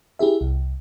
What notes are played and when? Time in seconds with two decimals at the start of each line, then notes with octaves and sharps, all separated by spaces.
0.19 E4 G4 G#4 E5
0.41 C2